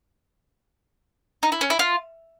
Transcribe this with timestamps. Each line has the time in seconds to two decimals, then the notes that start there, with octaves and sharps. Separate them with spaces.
1.43 D#4
1.52 E4
1.61 C#4
1.70 E4
1.79 F4